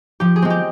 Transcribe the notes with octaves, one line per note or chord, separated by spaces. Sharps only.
F3 G4
G#4
G#3 C4
G4